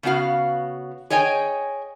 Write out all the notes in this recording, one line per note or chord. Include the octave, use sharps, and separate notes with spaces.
C#3 B3 D4 F#4 F5
G#4 C#5 D#5 G5 G#5